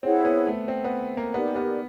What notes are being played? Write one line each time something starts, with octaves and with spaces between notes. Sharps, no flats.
C4 E4 G#4 C#5 F#5
B3
A3
C4
B3
A#3
B3 D#4 G4 A#4 D5
B3